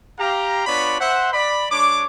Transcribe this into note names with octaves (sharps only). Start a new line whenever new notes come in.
G4 F5 A#5
B3 D4 F4 C#5 D5 B5
C5 E5 F#5
D5 B5
G#3 D4 C#5 D6